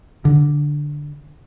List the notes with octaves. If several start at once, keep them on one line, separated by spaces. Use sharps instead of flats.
D3